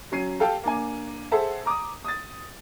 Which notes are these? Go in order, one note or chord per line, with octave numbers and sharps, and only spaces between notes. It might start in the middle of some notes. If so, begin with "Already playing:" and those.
F#3 C#4 C7 D#7
G4 A4 F5 G5 A5
A#3 D4 G#5
G#4 A4 C5 E5 F#5 A5
A#5 D6 D#6
D#6 A6